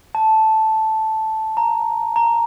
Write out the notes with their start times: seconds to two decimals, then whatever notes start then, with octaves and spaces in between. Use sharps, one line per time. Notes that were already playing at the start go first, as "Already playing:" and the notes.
0.15 A5
1.57 A#5
2.16 A#5